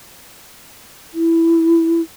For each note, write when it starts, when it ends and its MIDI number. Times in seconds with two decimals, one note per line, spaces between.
1.14 2.01 64